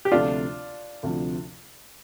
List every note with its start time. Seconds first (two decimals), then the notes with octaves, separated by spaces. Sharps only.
0.05 G4
0.11 D2 C3 F3 A3 D4 F4
1.03 D2 C3 F3